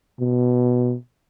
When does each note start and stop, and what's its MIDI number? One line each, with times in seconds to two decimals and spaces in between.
0.20 0.94 47